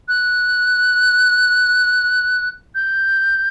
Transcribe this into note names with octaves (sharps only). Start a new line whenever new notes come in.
F#6
G6